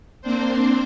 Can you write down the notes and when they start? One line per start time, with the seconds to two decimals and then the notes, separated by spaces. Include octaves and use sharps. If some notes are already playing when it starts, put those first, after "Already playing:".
0.22 A#3 C4 D4 C5